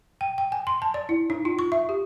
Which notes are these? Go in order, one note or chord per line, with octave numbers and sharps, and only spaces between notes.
G5
G5
G#5
C6
A5
D5
E4
D#4
F4
C#6
E5
G4